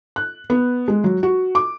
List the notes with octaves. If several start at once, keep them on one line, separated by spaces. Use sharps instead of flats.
F#6
B3
G#3
F#3
F#4
D6